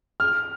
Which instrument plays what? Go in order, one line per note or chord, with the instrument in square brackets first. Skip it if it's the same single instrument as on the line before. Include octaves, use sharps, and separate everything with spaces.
[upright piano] F6